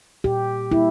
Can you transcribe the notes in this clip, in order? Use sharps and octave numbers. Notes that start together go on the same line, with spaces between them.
A#2 G4
G3 A#3 E4